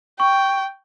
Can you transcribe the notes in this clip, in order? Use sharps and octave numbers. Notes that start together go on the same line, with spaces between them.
G5 C#6